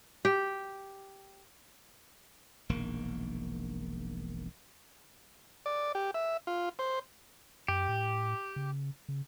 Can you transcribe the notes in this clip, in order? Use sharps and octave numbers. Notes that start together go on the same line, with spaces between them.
G4
E1 A#1 D#3 A#3
D5
G4
E5
F4
C5
F#2 G4
A2
C#3
C#3